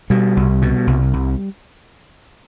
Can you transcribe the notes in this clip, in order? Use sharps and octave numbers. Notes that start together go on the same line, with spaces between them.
B2 G3
C2
B2
C2
C2